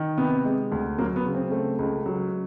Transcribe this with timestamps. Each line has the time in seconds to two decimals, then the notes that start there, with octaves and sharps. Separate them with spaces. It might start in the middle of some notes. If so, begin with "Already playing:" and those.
Already playing: D#3
0.18 C3 B3
0.45 G#3
0.72 D2
0.98 F#3 A#3
1.16 B3
1.25 C#3
1.35 C4
1.51 A3
1.79 C#2
2.06 F#3